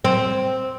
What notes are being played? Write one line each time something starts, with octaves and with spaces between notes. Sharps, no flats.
C4